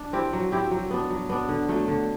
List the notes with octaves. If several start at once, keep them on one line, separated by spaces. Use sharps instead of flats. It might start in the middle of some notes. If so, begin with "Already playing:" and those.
Already playing: D4
C4 E4 G4
F#3
C4 E4 G4
F#3
B3 D4
F#3
B3 D4
D3
F#3 A3
D3